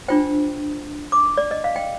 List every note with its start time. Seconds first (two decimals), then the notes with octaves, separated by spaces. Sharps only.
0.08 D4 F4 C5 G5
1.12 D6
1.37 D5
1.51 D#5
1.64 F5
1.76 G5